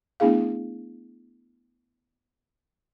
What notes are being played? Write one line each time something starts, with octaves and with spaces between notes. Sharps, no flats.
A3 B3 D4 E4 G#4 F5